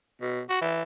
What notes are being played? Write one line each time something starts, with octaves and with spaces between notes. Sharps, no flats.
B2
F#4
E3